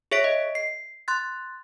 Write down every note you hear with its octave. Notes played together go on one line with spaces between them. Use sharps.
G#4 C#5 E5 B6 D7
D#5
C7
C6 F#6 A6